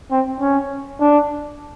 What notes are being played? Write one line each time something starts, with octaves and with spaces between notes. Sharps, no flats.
C4
C#4
D4